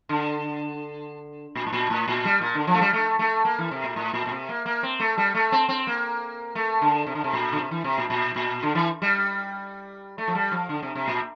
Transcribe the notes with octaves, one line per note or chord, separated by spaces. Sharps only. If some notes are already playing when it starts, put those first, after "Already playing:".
D3
A#2
A2
A#2
A2
A#2
G3
A#2
D3
F3
A3
G3
A3
A3
A#3
E3
C3
A#2
A2
A#2
A#2
C3
A#3
A#3
C4
A3
G3
A3
C4
C4
A#3
A3
D3
C3
D3
C3
A#2
D3
C3
E3
C3
A#2
A#2
A#2
D3
E3
G3
A3
F3
G3
F3
D3
C3
C3
A#2